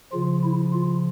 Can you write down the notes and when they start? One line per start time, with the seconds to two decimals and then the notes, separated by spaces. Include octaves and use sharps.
0.12 C#3 F3 F4
0.43 E4
0.72 F4